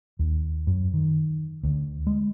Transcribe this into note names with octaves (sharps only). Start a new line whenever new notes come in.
D#2
F#2
D#3
D2
G#3